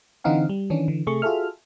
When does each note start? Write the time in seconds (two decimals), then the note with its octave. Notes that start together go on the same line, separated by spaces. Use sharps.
0.24 D3 E3 C4 D#4 F5 F#5
0.49 G3
0.70 D#3 E3 C#4 D4
0.88 D3 E3
1.07 C3 A3 G#4 C#6
1.22 F4 F#4 G#4 A4 E5 F6